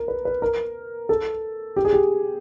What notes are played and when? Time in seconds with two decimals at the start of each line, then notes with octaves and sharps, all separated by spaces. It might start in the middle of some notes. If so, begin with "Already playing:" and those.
Already playing: A#4
0.08 B4
0.25 B4
0.42 A#4
1.09 A4
1.76 G4
1.85 G#4
1.93 G4